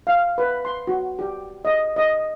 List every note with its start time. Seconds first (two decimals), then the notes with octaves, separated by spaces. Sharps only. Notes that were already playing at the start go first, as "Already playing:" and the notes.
0.07 F5
0.38 B4
0.65 C6
0.87 F#4
1.19 G4
1.65 D#5
1.96 D#5